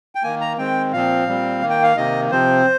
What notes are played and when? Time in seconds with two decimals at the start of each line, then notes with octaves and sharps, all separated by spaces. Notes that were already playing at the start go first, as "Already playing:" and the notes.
0.15 G5
0.23 D#3 A#3 G#5
0.41 A#5
0.58 D#3 G#3 C4 G5
0.93 A#2 F3 C4 F5
1.27 A#2 G3 C4
1.62 D#3 A#3
1.70 G5
1.83 F5
1.97 C3 D#3 A#3 D#5
2.31 C3 F3 C4 C5